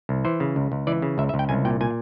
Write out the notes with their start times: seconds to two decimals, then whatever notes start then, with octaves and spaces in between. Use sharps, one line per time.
0.09 C2
0.25 E3 C5
0.40 C#3
0.56 C#2
0.72 C#2
0.87 E3 D5
1.02 C#3
1.18 C#2 E5
1.29 E5
1.34 C#2
1.39 G5
1.49 C2 G#5
1.65 A#2 G5
1.81 A#2 G#5